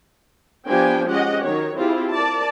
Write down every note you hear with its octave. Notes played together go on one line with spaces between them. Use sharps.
F3 B3 D4 G4 G5 G#5
G#3 C#4 G4 D#5 F#5
D#3 F#3 C#5
C4 E4 F4 G4 G#4
A#4 D5 A5